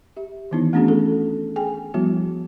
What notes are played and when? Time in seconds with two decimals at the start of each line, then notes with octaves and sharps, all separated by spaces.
0.17 G4 E5
0.51 D#3 E3 B3 D#4 E4
0.73 A3 B3 C#4 D4 F#4 G#4
0.88 G#4 A4
1.56 G#4 G5 G#5
1.94 F3 G3 B3 E4 F#4